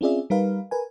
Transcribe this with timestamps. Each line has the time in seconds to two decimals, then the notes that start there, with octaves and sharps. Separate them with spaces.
0.01 C4 C#4 F4 G#4 D5 E5
0.30 G3 D#4 A#4 B4 F5
0.71 A#4 B4 G#5